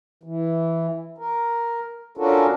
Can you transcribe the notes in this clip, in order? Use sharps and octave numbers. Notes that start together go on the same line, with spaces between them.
E3
A#4
C#4 D4 F4 F#4 A4 A#4